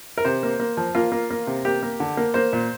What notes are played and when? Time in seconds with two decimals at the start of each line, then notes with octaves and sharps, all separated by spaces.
0.18 A#4
0.25 C3 C5
0.43 A#3
0.60 A#3
0.77 F3
0.95 A#3 F4
1.12 A#3
1.30 A#3
1.47 C3
1.65 A#3 G4
1.83 A#3
2.00 D3
2.17 A#3
2.34 A#3 C5
2.53 A#2